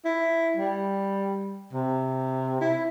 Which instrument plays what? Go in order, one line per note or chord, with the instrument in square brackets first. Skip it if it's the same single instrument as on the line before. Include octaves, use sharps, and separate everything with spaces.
[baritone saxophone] E4
G3
C3
E4